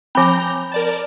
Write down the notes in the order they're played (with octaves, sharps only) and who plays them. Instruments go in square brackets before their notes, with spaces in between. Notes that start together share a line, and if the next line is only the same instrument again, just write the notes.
[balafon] F3 C4 [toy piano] G#5 B5 [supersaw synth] A#5 G6
[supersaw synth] A#4 D5 A5